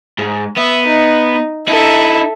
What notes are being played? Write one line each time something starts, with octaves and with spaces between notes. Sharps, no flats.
G#2
B3 E5
D#4
D#4 E4 A4 E5